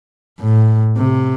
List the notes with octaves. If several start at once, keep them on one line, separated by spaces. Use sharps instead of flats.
A2
C3